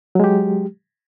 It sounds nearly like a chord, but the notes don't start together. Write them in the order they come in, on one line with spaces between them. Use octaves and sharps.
F#3 G#3 G4